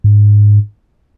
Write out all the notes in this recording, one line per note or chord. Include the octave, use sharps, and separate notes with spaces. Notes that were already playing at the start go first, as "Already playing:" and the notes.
G#2